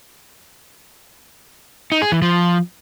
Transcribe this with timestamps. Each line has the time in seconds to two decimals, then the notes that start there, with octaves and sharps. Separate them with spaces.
1.92 D#4
2.02 G#4
2.12 E3
2.22 F3